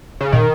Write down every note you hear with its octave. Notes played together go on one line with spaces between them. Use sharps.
C#3
A#2 D#3